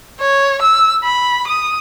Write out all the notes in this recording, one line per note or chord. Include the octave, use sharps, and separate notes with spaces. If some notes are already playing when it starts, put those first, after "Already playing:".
C#5
E6
B5
D#6